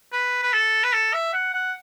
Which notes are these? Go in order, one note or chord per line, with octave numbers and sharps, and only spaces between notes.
B4
B4
A4
B4
A4
E5
F#5
F#5